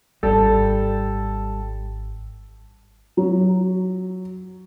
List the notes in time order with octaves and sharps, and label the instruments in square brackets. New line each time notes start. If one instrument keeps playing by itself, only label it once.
[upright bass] G#1 D4 [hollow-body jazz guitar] G3 [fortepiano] A4
[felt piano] F#3